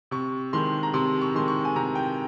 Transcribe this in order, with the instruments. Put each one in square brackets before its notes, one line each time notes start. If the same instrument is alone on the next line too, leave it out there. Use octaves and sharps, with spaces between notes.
[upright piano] C3 C#6
D#3 G#3 C6
A#5
C3 C6
C#6
D#3 G#3 C6
C#6
G#5
C3 A#5
G5